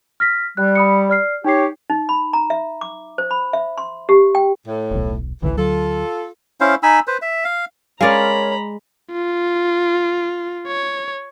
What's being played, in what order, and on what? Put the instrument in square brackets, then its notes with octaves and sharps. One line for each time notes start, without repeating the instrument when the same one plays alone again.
[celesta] F6 A#6 B6
[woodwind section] G3 [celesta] F#6
[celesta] B5 D#6 C#7
D5 F6 C7
[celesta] D#4 C7 [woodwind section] G4 C#5
[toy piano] D#4
B5
A#5
E5
D6
C5
B5
E5
C6
G4
G5
[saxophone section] A2
[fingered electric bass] D#1 B1
[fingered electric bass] G#1 C#2 D3 [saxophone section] E3
[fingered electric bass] D2 F#3 [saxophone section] F4 A4
[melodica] C#4 E4 C5 F5
D#4 G#5 B5 E6
B4 C5
E5
F5
[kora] G#3 D5 [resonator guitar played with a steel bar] C#4 A#4 F5 [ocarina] C#5 [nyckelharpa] A#5 B5
[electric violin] F4
C#5